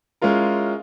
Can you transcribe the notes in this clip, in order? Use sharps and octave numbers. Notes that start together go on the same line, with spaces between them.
G#3 C#4 E4 F4 A#4